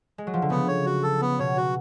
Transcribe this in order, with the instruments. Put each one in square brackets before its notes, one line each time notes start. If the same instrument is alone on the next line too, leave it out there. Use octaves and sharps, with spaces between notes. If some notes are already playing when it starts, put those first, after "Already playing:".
[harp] G#3
F#3
F3
D3
[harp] C#3 [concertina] B3
[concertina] C#5
F#4
A4
B3
[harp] B2 [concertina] C#5
[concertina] F#4